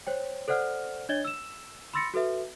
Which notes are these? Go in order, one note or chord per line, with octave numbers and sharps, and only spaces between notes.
C5 C#5 G5
A4 C5 D5 F#5 F6
D4 C#5 D#5 G#6 A6 G7
E6 E7
B5 C6 E6 A6 A#6 C#7
F#4 A4 B4 E5